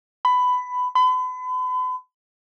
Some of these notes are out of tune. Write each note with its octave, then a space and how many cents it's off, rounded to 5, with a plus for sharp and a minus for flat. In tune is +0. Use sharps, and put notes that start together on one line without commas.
B5 +15
B5 +40